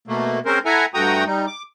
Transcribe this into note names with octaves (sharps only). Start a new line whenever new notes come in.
B2 A3 A#3
G#3 C4 C#4 A#4 C5
E4 A4 E5 F#5 G#5 A#5
G2 A3 F#4 G5 A#5 D#6
G3 D#4
D6